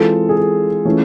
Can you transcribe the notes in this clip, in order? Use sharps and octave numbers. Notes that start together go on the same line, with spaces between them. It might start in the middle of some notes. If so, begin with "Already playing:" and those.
Already playing: E3 G#3 C4 F4 A4
G#4
A4
E3 A3 C#4 F4